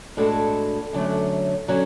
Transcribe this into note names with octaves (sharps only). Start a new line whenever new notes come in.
A2 G#3 D4 F#4 A4
F#2 D3 F#3 A3
D3 F#3 C#4 F#4